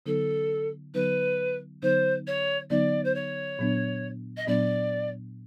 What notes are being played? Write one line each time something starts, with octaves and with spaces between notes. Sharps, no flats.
D3 F#3 B3 D#4 A4
D3 F#3 B3 D#4 B4
D3 F#3 B3 D#4 C5
C#5
D3 F#3 B3 D#4 D5
C5
C#5
A#2 F#3 B3 D4
D#5
A#2 F#3 B3 D4 D5